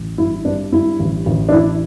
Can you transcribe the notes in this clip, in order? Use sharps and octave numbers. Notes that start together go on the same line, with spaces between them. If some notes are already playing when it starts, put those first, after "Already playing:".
Already playing: A1
G2 E4
G2 D4
G2 E4
A1
A1
D4
A1 E4